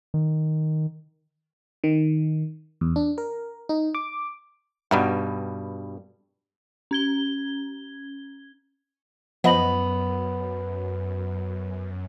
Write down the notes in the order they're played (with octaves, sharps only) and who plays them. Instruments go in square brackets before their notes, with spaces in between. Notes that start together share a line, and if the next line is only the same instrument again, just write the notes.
[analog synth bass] D#3
[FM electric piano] D#3
E2
D4
A#4
D#4
D6
[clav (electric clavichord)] G2 B2 G3 [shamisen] B3 D#4 F#5
[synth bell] C#4 G#6 G7
[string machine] F#2 [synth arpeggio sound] F3 D#5 [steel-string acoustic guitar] B3 [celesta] F#5 B5 F#7